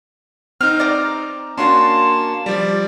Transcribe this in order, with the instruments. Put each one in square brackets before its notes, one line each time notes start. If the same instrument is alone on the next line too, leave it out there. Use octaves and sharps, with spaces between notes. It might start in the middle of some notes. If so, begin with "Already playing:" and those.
[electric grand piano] C4 D#4 [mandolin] F6
[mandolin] D5 A#5
[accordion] A#3 A5 [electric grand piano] C#4 D4 F#4 [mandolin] C6
[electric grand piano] F3 G3 [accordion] D5